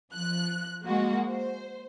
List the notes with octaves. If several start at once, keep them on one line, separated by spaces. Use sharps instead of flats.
F3 F#6
G#3 A#3 F#4
C5